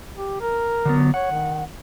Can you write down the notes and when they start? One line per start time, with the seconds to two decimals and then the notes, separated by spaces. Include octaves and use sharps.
0.16 G4
0.41 A#4
0.85 D3 F#3 B3
1.14 C#5 F#5
1.31 D#3